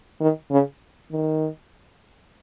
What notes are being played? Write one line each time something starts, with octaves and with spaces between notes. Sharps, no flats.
D#3
C#3
D#3